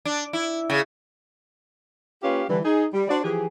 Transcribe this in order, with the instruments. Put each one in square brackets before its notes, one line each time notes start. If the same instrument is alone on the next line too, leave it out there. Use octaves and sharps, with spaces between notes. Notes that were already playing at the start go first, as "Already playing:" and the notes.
[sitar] D4
E4
C#3
[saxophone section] A#3 C#4 F4 G4 B4 F5
D3 E3 G3
D#4 G#4
G3
D4 F#4 C5 D5
E3 F3 G4 G#4